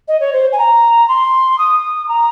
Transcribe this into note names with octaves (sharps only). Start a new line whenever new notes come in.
D#5
C#5
C5
G#5
A#5
C6
D#6
A#5